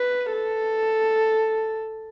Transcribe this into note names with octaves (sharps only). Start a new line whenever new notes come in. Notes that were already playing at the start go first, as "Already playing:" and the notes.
Already playing: B4
A4